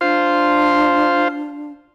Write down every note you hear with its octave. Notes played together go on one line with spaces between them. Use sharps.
D4 F4 C5